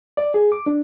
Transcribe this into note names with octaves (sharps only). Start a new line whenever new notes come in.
D5
G#4
D6
D4